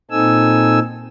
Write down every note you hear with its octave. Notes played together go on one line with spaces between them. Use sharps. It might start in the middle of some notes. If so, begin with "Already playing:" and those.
A#2 C4 D#4 A4 G#5 E6